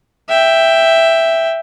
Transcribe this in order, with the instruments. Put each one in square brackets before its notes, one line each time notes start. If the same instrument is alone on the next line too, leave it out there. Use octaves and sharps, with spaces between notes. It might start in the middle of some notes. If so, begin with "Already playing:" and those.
[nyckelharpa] E5 G5